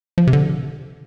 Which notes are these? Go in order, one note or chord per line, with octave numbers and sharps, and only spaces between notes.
F3
C3
D3